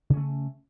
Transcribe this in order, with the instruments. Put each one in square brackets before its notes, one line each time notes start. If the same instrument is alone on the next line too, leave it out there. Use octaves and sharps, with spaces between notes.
[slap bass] C#3
C#4
A3